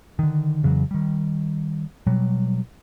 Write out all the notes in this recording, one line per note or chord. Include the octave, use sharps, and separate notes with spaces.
D3 D#3
F2 C#3 E3 F#3
D#3 G3
B2 F#3 G3